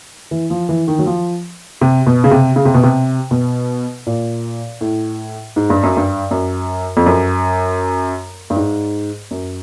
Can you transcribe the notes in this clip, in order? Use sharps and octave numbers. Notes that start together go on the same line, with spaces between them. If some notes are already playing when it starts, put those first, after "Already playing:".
E3
F3
E3
D#3
F#3
F3
C3
B2
C#3
C3
C#3
C3
B2
C3
B2
A#2
A2
G#2
G2
F#2
G2
F#2
F2
F#2
G2
G#2
F#2